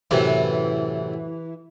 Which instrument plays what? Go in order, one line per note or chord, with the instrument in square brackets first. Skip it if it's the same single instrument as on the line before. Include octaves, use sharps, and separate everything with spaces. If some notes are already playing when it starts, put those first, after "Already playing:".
[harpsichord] F#2 A2 C3 [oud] E3